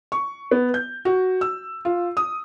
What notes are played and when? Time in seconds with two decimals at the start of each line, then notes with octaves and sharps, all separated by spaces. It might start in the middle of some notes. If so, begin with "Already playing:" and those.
0.12 C#6
0.51 B3
0.74 G6
1.05 F#4
1.41 E6
1.85 F4
2.17 D#6